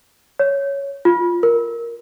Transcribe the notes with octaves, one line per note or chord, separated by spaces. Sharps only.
C#5
F4
A#4